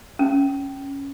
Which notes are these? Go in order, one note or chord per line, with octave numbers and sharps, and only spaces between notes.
C#4